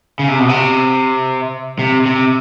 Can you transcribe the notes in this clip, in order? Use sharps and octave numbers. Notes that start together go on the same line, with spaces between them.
C#3
C3
B2
C3
C3
C3